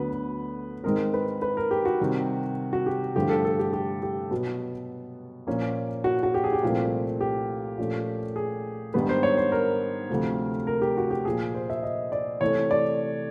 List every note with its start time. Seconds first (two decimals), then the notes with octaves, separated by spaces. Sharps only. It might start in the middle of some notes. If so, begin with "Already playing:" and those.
Already playing: D2 D3 F#3 B3 B4
0.84 G#2 D#3 G#3 C4 A#4
1.14 B4
1.42 B4
1.57 A#4
1.71 G4
1.85 F#4
2.00 C3 D#3 G3 C4
2.73 F#4
2.86 G4
3.15 G2 D3 F3 A3 G4
3.29 A4
3.45 A4
3.59 G4
3.73 G4
4.03 G4
4.31 B2 F#3 B3
5.47 A#2 F3 A#3 C#4
6.04 F#4
6.23 F#4
6.34 G4
6.44 G#4
6.53 G4
6.62 C2 A#2 F3 A3 C4
7.21 G4
7.78 A#2 F3 A3 C#4
8.36 G#4
8.94 G#2 D#3 G3 B3 D4 B4
9.09 C5
9.23 C#5
9.37 C5
9.52 A#4
10.10 D2 C3 F3 A3
10.67 A#4
10.82 G4
10.97 F#4
11.11 G4
11.25 A#2 F3 A#3 G#4
11.55 C5
11.70 E5
11.83 D#5
12.12 D5
12.41 C3 E3 A3 C#5
12.71 D5